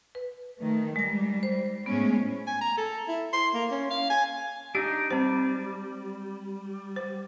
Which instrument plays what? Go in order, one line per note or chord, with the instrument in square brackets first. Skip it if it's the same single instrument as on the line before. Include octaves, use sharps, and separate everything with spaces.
[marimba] B4
[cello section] D#3 A3
[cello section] G3 [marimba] G#3 A#6
[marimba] C5
[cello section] A2 G#3 C#4 [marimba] B3
[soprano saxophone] G#5
A#5
A4
E4
C6
A#3
C#4
F5
G#5
[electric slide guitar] D4 D#4 [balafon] G4
[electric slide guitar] G3 [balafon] C4 C5
[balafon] C5